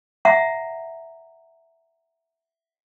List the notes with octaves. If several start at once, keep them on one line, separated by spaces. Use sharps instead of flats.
E5 F#5 A#5